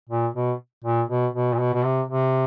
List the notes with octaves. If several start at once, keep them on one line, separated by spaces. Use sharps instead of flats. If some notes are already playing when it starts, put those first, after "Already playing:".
A#2
B2
A#2
B2
B2
A#2
B2
B2
C3
C3